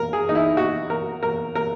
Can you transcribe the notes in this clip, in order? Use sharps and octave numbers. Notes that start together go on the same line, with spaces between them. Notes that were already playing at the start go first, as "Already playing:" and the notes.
Already playing: A#4
G#4
D#4
E4
F#4
A#4
A#4
A#4